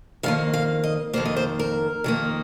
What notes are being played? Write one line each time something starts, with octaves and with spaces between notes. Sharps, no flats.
F2 D#3 A#3 F5
F5
D#5
F2 D#3 A#3 C5
D#5
C5
A#4
F2 D#3 A#3